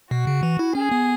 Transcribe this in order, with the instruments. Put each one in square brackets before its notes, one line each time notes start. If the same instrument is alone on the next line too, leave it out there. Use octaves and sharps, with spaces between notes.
[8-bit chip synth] B2 [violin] F#4
[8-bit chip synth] C#3
E3
E4
[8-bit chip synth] C#4 [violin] G#4
[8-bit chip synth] B3